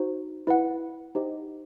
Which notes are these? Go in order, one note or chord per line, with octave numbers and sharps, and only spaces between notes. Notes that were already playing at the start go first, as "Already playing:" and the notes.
Already playing: D#4 F#4 C5
E4 B4 F#5
D#4 G4 C5 D#5